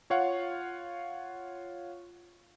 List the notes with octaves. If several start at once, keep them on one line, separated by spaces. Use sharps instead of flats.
F4 C#5 F5 F#5